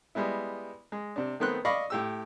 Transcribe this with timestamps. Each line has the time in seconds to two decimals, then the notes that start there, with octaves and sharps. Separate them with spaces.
0.15 G3 G#3 B3 E4
0.92 G#3
1.16 C3 D4
1.40 D#3 A3 B3 C4 C6 F#6
1.65 D5 D#5 F5 B5 C#6
1.90 A2 G4 E6